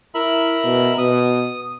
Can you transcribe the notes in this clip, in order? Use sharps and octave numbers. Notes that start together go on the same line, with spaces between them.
E4 A#4 E5 B5
B2
B2 D#6